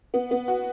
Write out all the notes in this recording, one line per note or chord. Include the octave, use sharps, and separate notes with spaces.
B3
B3
F#4